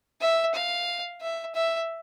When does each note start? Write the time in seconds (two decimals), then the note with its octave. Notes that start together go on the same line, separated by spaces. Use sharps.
0.21 E5
0.54 F5
1.21 E5
1.55 E5